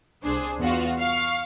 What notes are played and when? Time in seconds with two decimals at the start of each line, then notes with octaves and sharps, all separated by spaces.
0.23 C2 D4 G#4 C5
0.59 E2 B3 F4 F#4 F5
0.97 F5 C#6